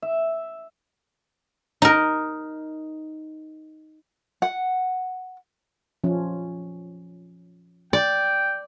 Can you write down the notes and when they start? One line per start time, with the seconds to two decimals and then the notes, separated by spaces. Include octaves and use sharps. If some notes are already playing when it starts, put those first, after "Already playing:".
0.02 E5
1.82 D#4 A#4
4.42 F#5
6.04 F3 C#4
7.93 D5 G5